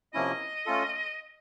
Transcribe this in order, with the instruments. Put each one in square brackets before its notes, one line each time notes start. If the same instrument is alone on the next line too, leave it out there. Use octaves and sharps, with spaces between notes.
[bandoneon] C3 F3 A#3 C#4 E4 [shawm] D#5
[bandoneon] A3 C#4 F4 A4